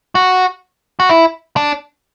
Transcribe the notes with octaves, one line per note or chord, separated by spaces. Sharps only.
F#4
F#4
E4
D4